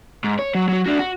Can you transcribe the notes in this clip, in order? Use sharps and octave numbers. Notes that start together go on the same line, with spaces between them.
G#2
C#5
F#3
F#3 F#4
D4 F#4
F#4